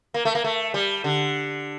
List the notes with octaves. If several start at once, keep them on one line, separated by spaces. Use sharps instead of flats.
A#3
A3
A#3
A3
G3
D3